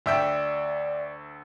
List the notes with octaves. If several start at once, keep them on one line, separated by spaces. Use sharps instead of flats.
D2 D5 E5 G5